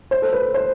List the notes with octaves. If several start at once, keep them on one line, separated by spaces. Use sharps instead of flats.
C5
A4
B4
C5